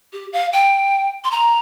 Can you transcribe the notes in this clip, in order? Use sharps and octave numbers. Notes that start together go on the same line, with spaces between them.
G4
F5
G5
C6
A#5